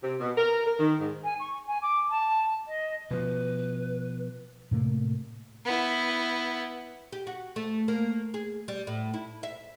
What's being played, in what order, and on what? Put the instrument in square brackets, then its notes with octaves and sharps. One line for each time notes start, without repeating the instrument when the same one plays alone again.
[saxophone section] C3
B2
A#4
A#4
D#3
G#2
[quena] G#5
C#6
G#5
D6
A5
D#5
[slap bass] B2 F3 [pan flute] B4
[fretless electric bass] A2 C3 A3 A#3
[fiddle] B3 E4
[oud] G4
F#4
A3
A#3
G#4
G3
A2
E4
E5